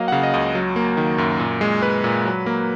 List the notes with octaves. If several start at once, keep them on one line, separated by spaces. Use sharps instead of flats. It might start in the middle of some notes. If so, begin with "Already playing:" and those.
Already playing: F#3 A#3 D#5 F5
F#5
C#3 F5
D#5
C#2 D#5
F#3
A#3
D#3
F#2
A#2
G#3
G#3 B4
A#2
F#3
A#3